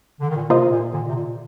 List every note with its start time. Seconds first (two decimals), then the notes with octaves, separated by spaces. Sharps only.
0.20 D3
0.29 D#3
0.36 A#2 D3
0.50 C3 A#3 F4 C5 D#5
0.72 A#2
0.93 A#2 D3
1.09 C3
1.15 A#2